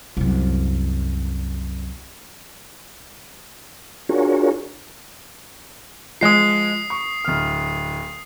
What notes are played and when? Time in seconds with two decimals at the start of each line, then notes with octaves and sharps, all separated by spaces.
0.17 C2 F#2
4.09 D4 F4 F#4 G#4 A#4 C#5
6.21 F3 G#3 D#6 C7
6.90 C#6
7.25 D1 F6